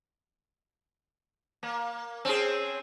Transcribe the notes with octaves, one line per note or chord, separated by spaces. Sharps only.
A#3
C4 C#4 G#4